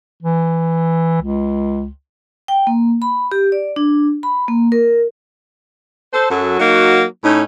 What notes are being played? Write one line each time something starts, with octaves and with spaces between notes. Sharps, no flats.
E3
C#2
G5
A#3
B5
G4
D5
D4
B5
A#3
A#4
A4 C5
F#2 F#3 A4
F#3 A#3 D#4 F#4
A2 C#4 D#4